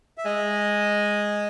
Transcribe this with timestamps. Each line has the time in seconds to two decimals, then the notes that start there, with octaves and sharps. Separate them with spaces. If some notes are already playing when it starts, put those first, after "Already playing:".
0.18 E5
0.26 G#3 D#5